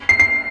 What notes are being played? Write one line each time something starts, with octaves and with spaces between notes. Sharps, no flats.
C7
C7